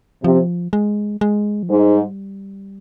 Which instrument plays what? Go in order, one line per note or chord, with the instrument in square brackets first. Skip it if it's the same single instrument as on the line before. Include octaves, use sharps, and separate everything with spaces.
[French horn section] C3 [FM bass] F3
[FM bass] G#3
G#3
F3
[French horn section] G#2 [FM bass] G3